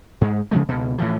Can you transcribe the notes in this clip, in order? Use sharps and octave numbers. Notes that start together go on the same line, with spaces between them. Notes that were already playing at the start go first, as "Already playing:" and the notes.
G#2 G#3
C#3 F3 G#3 A3
C#2 B2
A2 E3 F3